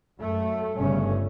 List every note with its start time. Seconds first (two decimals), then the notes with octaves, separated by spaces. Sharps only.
0.19 F#2 A3
0.76 G1 G2 C#3 A3 C#4